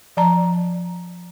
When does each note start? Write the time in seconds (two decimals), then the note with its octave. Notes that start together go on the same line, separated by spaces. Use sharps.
0.17 F3 D5 A5 A#5